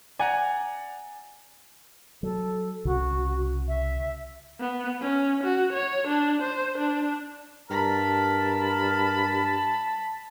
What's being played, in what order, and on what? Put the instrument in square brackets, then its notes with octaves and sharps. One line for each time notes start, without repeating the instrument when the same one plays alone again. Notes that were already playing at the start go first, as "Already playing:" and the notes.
[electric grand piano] D5 F#5 A#5 [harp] G#5
[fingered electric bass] F#3 [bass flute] A4
[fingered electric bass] C2 C#3 [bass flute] F#4
[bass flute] E5
[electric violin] B3
C#4
F#4
C#5
D4
C5
D4
[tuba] G2 [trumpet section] A#4 [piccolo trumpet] A5 [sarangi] B5